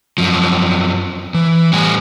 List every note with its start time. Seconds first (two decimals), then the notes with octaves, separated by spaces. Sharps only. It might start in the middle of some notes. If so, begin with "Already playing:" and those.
0.18 F#2 F3
1.34 E3
1.73 A2 G3 G#5